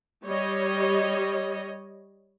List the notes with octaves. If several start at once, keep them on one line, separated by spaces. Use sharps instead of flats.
G3 C#5 D#5